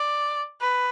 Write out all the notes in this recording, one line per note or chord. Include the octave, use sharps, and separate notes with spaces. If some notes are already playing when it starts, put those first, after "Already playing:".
Already playing: D5
B4